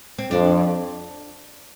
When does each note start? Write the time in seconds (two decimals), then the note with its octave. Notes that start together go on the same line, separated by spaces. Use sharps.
0.18 C4
0.30 F2 D4